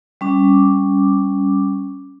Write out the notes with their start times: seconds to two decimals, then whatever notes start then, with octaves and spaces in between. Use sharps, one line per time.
0.21 G3 C#4 D6